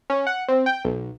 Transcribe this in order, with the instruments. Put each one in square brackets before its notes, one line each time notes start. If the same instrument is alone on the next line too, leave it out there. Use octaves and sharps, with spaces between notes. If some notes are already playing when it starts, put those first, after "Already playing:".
[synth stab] C#4
F#5
C4
G5
B1